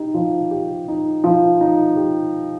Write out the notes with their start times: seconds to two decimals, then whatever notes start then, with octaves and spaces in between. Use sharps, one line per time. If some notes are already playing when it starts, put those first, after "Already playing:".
Already playing: D#4 G4
0.14 F3
0.51 G4
0.88 D#4
1.24 F3
1.61 D#4
1.97 G4